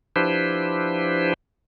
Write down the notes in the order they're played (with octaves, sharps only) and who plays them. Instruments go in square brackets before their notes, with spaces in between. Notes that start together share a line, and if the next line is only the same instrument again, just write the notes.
[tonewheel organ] F3 D4 E4 G4 B4 C5